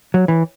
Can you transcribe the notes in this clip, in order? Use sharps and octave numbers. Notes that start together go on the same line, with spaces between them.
F#3
E3